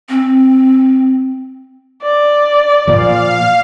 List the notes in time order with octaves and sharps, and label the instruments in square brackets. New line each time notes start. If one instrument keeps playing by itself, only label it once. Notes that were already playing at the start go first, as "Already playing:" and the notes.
[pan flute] C4
[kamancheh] D5
[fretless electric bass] A#2 F3 [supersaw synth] F5